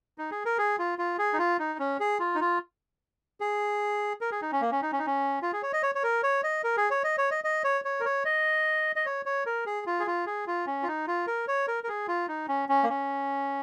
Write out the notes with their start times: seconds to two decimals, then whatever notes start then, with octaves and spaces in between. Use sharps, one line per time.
0.18 D#4
0.31 G#4
0.45 A#4
0.58 G#4
0.79 F4
0.98 F4
1.19 G#4
1.33 D#4
1.39 F4
1.59 D#4
1.79 C#4
2.00 G#4
2.20 F4
2.35 D#4
2.40 F4
3.40 G#4
4.21 A#4
4.32 G#4
4.42 D#4
4.52 C#4
4.61 A#3
4.72 C#4
4.82 D#4
4.92 C#4
4.99 D#4
5.06 C#4
5.42 F4
5.53 G#4
5.63 C#5
5.73 D#5
5.83 C#5
5.95 C#5
6.03 A#4
6.23 C#5
6.44 D#5
6.64 A#4
6.77 G#4
6.90 C#5
7.04 D#5
7.18 C#5
7.31 D#5
7.44 D#5
7.64 C#5
7.85 C#5
8.00 A#4
8.05 C#5
8.25 D#5
8.96 D#5
9.06 C#5
9.26 C#5
9.46 A#4
9.66 G#4
9.87 F4
10.00 G#4
10.07 F4
10.27 G#4
10.47 F4
10.67 C#4
10.83 F4
10.88 D#4
11.08 F4
11.27 A#4
11.48 C#5
11.68 A#4
11.84 A#4
11.88 G#4
12.08 F4
12.28 D#4
12.49 C#4
12.69 C#4
12.84 A#3
12.89 C#4